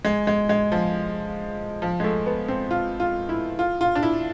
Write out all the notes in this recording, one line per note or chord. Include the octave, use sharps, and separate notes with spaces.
G#3
G#3
G#3
F3
F3
G#3
A3
B3
C4
F4
F4
E4
F4
F4
D4
E4